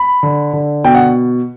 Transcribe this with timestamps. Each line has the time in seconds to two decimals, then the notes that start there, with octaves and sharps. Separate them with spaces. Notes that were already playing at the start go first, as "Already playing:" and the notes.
Already playing: B5
0.23 D3
0.53 D3
0.84 B2 G5
0.95 F#5